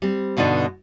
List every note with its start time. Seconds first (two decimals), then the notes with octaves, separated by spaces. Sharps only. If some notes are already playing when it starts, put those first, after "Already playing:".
0.02 G3 C4
0.37 G2 B2 D3 D#4 D5